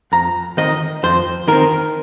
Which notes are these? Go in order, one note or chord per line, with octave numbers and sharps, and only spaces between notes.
F2 A#5
D#3 C4 D#5
F2 C5
D#3 C4 A#4